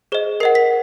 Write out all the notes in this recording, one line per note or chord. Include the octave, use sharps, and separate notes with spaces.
G#4 C5 D#5
A#4 D#5 F#5 C7
B6